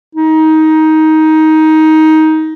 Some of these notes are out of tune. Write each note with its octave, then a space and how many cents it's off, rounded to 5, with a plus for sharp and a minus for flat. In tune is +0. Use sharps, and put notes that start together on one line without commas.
D#4 +15